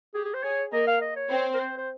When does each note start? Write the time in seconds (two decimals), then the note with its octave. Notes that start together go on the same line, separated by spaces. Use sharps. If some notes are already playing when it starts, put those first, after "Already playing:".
0.14 G4 G#4
0.25 G#4
0.34 C5
0.43 G#4 C#5
0.72 A#3 A#4 D#5
0.87 F5
1.01 D#5
1.16 C#5
1.30 C4 C5
1.54 A#4
1.59 C5
1.77 C5